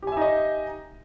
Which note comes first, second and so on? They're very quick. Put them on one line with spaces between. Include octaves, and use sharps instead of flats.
G4 G#5 E5 D#4 D#5